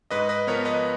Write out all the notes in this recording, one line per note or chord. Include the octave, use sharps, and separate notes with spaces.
G#2 B4 D#5
B4 D#5
F3 B3 A#4 C#5
B4 D#5